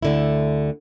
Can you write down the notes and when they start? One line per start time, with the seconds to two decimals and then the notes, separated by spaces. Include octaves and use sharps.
0.03 D2 D3 E4